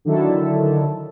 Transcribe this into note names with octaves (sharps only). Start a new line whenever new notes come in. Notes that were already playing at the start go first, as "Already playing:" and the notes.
D3 D#3 F#3 E4 A4